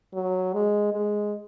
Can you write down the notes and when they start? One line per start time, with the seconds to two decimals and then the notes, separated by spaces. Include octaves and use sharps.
0.14 F#3
0.53 G#3
0.92 G#3